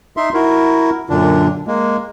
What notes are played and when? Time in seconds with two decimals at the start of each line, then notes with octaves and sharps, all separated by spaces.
0.17 D#4 E5 C6
0.34 E4 F#4 A#4
1.10 F#2 A#2 D3 D4
1.67 G#3 A#3